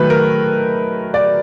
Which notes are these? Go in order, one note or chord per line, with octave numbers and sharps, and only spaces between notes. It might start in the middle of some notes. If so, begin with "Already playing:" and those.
Already playing: D#3 F#3 A3 B4
A#4
D5